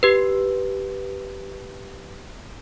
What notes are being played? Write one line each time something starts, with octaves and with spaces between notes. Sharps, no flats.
G4 B4